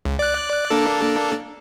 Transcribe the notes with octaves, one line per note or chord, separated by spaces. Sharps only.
C#2
D5 F#6
A#3 D4 A4